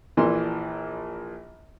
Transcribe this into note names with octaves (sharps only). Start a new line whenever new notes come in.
A#1 E3 F3 A#3 D5 C6